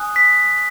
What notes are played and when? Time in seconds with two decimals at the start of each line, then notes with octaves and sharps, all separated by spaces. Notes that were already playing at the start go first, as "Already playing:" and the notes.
Already playing: G#5 D#6 F#6
0.16 B6